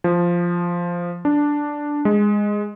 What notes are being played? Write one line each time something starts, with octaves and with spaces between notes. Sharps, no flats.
F3
D4
G#3